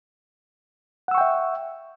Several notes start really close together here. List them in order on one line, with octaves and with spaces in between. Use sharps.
F#5 E6 C#6 G5 E5